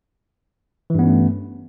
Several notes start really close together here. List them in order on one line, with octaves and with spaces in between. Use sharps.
E3 G2 B3 C#4 A3